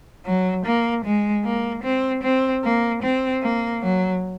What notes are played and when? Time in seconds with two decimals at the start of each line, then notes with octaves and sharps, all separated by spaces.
0.26 F#3
0.65 A#3
1.05 G#3
1.44 A#3
1.84 C4
2.23 C4
2.63 A#3
3.02 C4
3.42 A#3
3.82 F#3